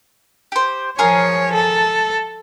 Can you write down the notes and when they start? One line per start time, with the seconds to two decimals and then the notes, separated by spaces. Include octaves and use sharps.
0.52 G4 C5
0.99 F3 G#4 A#4 C#5 F5
1.54 A4